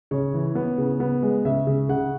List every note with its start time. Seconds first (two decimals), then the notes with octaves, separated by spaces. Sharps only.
0.11 C#3 C#5
0.33 E3
0.55 B3
0.78 C#3
1.00 B3
1.23 G#3
1.45 C#3 E5
1.67 C#3
1.89 C#3 F#5